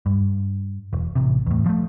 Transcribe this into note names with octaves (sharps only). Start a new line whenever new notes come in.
G2
E1
A1 C3
E2 A2
F3 A3